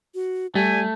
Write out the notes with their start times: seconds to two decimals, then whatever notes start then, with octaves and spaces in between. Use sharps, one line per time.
0.15 F#4
0.55 G3 A3 G4 G#5